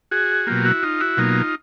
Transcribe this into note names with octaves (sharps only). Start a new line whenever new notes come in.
F#4 G#4
B2 F#3 A#3 F4 G4
E4 F#4
D#4 F4
E4 F#4
B2 F#3 A#3 D#4 F4